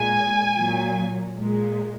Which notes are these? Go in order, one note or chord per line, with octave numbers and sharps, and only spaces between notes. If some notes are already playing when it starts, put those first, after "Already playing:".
Already playing: A#2 G#3 G#5
A#2 F#3
A#2 G#3